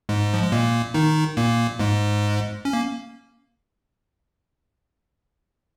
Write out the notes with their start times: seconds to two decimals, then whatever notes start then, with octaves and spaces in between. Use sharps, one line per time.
0.09 G#2 G#3
0.34 F3
0.43 G#3
0.52 A#2 A#3
0.94 D#3 D#4
1.37 A#2 A#3
1.79 G#2 G#3
2.65 C#4
2.73 A#3